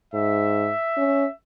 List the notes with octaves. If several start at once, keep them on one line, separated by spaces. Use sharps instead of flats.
G#2 E5
C#4